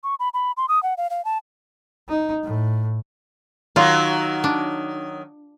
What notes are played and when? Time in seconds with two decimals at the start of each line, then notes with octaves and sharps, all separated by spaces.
0.04 C#6
0.20 B5
0.34 B5
0.57 C6
0.69 D#6
0.83 F#5
0.98 F5
1.10 F5
1.25 A5
2.09 D#4
2.44 A2
3.76 D#3 F#3 D#4 F4
4.44 D4